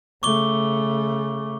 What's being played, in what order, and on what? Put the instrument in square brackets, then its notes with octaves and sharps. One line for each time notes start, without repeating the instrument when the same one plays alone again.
[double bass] C#3 A3 [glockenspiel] C#6 D6 G7